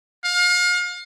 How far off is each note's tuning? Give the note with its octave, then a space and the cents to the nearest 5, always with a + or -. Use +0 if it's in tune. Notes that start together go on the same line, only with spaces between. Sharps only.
F5 +35